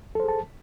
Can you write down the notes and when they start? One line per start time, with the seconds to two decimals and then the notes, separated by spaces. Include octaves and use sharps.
0.15 A4
0.20 C5
0.24 G#4
0.28 A5